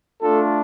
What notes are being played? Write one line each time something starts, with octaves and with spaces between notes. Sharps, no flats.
A3 D4 F4 A4